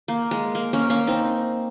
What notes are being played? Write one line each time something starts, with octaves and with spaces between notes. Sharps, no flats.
A#3
G#3
A#3
A#3 C#4
A#3 C#4
C4 D#4